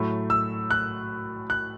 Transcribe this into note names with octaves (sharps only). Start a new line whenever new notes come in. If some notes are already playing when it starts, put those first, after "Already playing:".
Already playing: A2 F#3 A3
E6
F#6
F#6